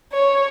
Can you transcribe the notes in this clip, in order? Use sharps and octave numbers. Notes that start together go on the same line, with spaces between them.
C#5